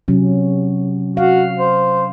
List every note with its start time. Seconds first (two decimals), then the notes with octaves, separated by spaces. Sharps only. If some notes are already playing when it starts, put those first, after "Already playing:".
0.08 C3 F#3 C#4
1.17 F#4 F5
1.59 C5